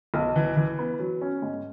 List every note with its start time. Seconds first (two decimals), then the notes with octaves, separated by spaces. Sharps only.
0.14 B1
0.36 E3
0.57 E3
0.79 B3
0.99 F#3
1.22 C#4
1.42 G#2